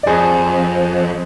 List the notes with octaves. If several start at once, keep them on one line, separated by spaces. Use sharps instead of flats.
D5
F2 G#4 C5